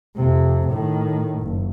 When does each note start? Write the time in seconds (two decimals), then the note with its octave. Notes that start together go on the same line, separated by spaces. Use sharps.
0.16 F2 C3
0.68 A2 D#3
1.40 F#1